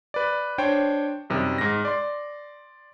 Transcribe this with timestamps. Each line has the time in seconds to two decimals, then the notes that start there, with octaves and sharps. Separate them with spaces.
0.14 B4 D5
0.58 D4 C5 C#5 G5
1.30 F#2 C3 D#3 G3
1.58 G#2 A#6
1.85 D5 C6